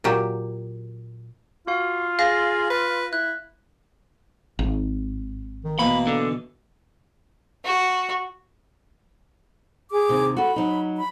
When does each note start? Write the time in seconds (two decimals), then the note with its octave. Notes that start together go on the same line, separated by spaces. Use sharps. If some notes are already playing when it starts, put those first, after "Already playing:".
0.04 A#2 F#3 G4
1.67 F4 F#4 F5
2.19 G#4 F5 A6 A#6
2.70 B4
3.13 E4 F#6
4.59 G#1
5.64 D#3
5.79 B2 E3 A#3 B5
6.07 D3
7.65 F#4
9.92 G#4 D6
10.09 D#2 C3
10.37 F#4 A4 B5
10.56 F#3 D#4
10.97 B5